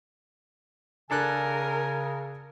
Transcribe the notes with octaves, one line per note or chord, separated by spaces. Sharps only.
C#3 D4 A4 A#4 G#5 F#6